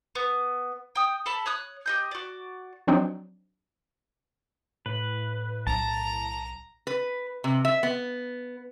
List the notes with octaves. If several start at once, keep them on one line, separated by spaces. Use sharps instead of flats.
B3
G5 D#6
A4 A5 B5
C#5 D#6 F#6
G4 D#5 G6
F#4 D5
F3 F#3 C4 D4 D#4
A2 B4
B1 A5 A#5
B4
C3
E5
B3